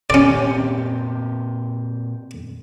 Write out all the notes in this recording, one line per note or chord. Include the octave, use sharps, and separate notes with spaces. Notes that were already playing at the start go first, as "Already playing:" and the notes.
A#2 C4 C#4 G4 D5